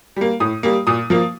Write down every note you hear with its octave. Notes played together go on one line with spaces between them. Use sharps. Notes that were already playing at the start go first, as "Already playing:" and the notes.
G3 A#3
A2 D#6
G3 A#3
A#2 D#6
F3 A#3